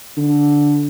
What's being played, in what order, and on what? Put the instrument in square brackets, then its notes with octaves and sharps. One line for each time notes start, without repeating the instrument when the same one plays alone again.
[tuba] D3